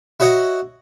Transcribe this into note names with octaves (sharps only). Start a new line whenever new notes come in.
E4 F#4 C#5 D#5 F#5